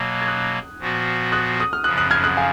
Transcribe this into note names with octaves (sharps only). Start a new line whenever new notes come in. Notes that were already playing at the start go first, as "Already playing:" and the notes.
Already playing: B2 F#3 A#3
G#6
D#6 F#6
A#2 F3 B3 F#4
D#6 F#6
D#6
F6
F#2 C#3 F3 D#6 F#6
D#6 F#6
F6 G#6
D#6 F#6
F5 G#5